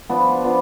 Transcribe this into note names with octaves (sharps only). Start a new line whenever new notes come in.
F3 B3 D4
F3 B3 D4